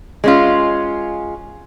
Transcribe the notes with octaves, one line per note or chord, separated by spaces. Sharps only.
G#3 C#4 F4